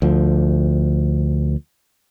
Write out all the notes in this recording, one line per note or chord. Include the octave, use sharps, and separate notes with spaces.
D2 F3